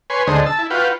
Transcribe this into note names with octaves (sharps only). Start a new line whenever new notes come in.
B4 C#5 G#5 C6
D2 D3 G#3 C5 D#5
A5 E6
E4
F4 F#4 B4 G5